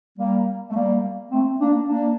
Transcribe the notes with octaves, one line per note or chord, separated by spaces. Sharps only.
G3 A#3
A3
G3 A#3
A3 C4
A#3 D4
A#3 D4